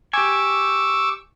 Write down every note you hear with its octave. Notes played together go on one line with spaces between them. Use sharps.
G4 G#5 C#6 D6 E6